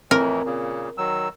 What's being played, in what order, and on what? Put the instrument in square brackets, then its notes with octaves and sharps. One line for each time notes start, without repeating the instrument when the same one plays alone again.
[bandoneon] F2 A2 E3 [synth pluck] C4 [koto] A#4
[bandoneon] A#2 C#3
D#3 F#3 E6